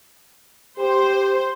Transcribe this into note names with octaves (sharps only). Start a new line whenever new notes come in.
G4 C5